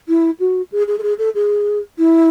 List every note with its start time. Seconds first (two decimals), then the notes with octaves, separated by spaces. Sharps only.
0.08 E4
0.40 F#4
0.72 G#4
0.87 G#4
0.98 A4
1.02 G#4
1.18 A4
1.35 G#4
1.98 E4